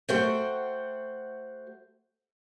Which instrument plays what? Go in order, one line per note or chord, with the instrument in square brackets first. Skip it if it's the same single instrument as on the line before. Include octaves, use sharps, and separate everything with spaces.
[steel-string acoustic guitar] A3 F#4 C5 F#5 G5